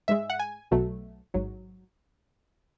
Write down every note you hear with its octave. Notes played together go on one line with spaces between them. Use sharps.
G#2 G#3 E5
F#5
G#5
B1 B2 F#3 A3
A1 G#2 F#3